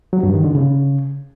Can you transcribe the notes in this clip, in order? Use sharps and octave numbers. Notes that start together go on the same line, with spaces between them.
F#3
G2
D#3
D3
C#3